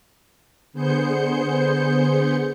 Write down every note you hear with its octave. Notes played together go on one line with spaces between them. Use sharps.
D3 B3 G#4 C5 G6 C#7